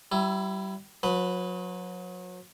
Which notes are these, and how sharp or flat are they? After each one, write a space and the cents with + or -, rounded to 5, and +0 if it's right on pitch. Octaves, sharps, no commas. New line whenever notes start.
G3 -35 E4 +15
F#3 -35 B4 +0